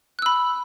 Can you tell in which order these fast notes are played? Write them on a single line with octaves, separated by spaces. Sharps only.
F#6 E6 B5